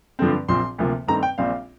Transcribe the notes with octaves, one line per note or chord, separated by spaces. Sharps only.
G2 D3 F3 A3 C4
A#1 A#2 F3 C4 C6
D2 C3 F3 A#3
G2 D#3 A3 C4 A#5
G5
A#1 A#2 G3 C4 F5